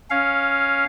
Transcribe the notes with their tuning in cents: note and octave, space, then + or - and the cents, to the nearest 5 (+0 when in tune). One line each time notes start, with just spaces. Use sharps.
C#4 +0 F5 +0